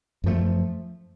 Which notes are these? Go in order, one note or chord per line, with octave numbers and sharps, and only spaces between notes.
F#2 F3 A3